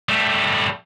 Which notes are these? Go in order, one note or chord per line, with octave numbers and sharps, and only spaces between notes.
G3 A3